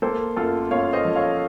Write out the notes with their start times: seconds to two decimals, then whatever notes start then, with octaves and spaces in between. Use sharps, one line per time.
0.02 A#3 A4 C5
0.37 F#2 F4 A4
0.71 F#2 C#5 F5
0.93 C5 D#5
1.05 F3
1.16 C#5 F5